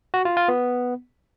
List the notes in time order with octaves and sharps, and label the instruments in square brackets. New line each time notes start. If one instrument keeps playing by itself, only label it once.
[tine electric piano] F#4
F4
F4
B3